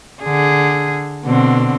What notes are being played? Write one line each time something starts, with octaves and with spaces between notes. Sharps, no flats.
D3 G#4
B2 D3 C4